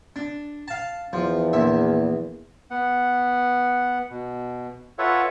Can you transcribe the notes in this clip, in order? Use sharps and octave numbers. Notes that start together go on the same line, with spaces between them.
D4
F5 A5
E2 F3
A#1 E5
B3 F#5
B2
F4 A4 B4 C#5 E5 F#5